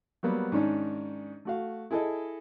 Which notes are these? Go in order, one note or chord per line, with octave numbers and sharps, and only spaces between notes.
F#3 G3 A#3 B3
G#2 D#3 C#4 D4
A3 F#4 F5
E4 G#4 A4 D#5